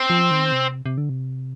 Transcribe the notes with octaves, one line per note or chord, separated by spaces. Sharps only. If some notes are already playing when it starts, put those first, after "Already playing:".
Already playing: C4
F3
D#3
C3
C3
D3
C3